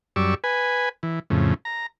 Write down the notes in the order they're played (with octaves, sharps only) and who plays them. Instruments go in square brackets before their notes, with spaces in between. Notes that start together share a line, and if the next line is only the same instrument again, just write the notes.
[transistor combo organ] F#2 G3 D5 C#6 E6
B4 G#5
E3
F2 A2 C#3
A#5